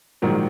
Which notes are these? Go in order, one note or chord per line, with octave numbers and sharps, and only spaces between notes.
A#1 G#2 D#3 F#3 A#3